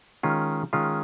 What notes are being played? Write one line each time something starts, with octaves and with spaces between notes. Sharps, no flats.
D#3 G#3 C#4 F4
D#3 G#3 C#4 F4